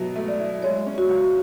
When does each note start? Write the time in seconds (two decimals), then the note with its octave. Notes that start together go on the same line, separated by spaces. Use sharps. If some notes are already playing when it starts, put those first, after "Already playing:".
Already playing: B2 F#3 E4
0.16 A3
0.28 D5
0.39 E4
0.62 G#3 C#5
0.86 C#4
0.98 F#4
1.09 C#2